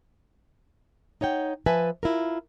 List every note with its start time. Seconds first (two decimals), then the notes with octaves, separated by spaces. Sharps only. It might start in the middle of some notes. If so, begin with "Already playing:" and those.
1.21 D#4 C#5 F#5 G5
1.66 F3 B4 E5 G#5 A5
2.03 E4 F4 A#4